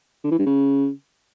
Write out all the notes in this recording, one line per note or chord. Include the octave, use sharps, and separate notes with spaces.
D3
E3
G2
C#3